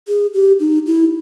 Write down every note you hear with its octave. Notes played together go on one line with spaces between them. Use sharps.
G#4
G4
D#4
E4